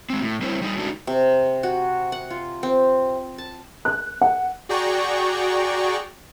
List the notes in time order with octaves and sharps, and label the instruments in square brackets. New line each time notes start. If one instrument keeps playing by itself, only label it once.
[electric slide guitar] G#3 C4
A2
G3 C4 C#4 E4 C5
G3 D#4
G#3 A3 D4 D#4 F#4
[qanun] C3
F#4
F#5
F4
C4
A5
[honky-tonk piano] F#6
F#5
[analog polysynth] F#4 G#4 D5 G5 A#5 C#6